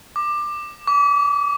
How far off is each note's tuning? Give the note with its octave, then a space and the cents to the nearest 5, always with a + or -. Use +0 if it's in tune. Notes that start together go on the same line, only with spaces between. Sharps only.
D6 +20
D6 -35